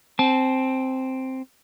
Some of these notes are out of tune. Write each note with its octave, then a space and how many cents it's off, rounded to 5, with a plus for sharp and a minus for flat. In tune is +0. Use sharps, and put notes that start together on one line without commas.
C4 +0 A5 -30